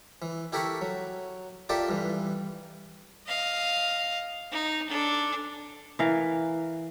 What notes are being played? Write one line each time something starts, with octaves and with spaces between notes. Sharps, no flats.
E3
E4 G4 A4 A#4 B5 C#6
F#3
F4 G4 A4 A#4 D5 E5
G2 E3
D#5 F5
D#4
D4 A4
E3 A#4 F5